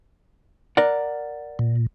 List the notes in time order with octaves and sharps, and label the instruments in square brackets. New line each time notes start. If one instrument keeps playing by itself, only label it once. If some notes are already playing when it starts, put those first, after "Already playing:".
[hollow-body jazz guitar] A#4 D5 F#5
[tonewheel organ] A#2